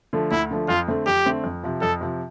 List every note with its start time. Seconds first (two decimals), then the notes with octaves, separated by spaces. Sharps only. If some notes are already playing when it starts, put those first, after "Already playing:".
0.13 D3 F3 A3
0.31 D2 E4
0.51 D3 F3 A3
0.68 F2 F4
0.88 D3 A3 C4
1.07 F2 G4
1.26 D3 A3 C4
1.44 F2
1.63 C3 F3
1.82 F2 A4
2.01 C3 F3